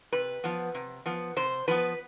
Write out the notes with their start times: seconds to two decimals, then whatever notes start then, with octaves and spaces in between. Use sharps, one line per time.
0.12 C3 B4
0.44 F3 B3
0.75 C3
1.06 F3 B3
1.36 C3 C5
1.68 F3 B3 B4